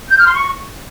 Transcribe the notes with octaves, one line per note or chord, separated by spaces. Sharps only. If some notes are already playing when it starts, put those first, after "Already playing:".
G6
F6
C6
C#6